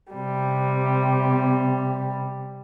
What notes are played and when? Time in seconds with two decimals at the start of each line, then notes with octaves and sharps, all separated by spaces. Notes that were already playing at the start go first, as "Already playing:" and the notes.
0.13 C3 G3